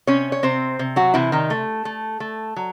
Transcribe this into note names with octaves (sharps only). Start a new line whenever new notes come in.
C3 C#4 C#5
C#5
C3 C4 C5
C3
F#3 F#4
C3 E3 E4
D#3 D#4
A3
A3
A3
F#3